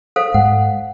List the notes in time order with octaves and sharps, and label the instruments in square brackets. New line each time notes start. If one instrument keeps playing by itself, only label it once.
[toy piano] A4 C5 F5
[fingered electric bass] G#2 [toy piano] F#5